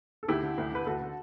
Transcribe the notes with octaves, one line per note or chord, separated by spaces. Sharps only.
A4
D2 E4 G4
D3
D2
D3 B4
D2 F#4 A4
D3